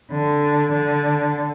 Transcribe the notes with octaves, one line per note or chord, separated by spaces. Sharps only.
D3
D3